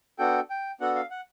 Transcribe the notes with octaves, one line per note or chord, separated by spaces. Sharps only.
B3 D4 F#4 A4 G5
G5
B3 D4 F#4 A4 F#5
F5
F#5